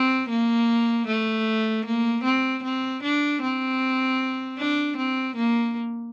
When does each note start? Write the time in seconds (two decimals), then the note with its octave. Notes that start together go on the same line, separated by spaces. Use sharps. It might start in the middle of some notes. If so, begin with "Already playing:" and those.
Already playing: C4
0.29 A#3
1.07 A3
1.85 A#3
2.24 C4
2.63 C4
3.03 D4
3.42 C4
4.58 D4
4.97 C4
5.36 A#3